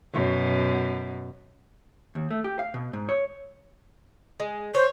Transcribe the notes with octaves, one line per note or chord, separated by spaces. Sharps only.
F#2 B2
D#2
A3
G4
F5
B2
G#2
C#5
G#3
C5 C#5